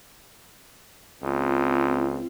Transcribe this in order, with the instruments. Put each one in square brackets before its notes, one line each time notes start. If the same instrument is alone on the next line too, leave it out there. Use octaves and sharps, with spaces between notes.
[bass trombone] C#2 [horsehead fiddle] C4 F4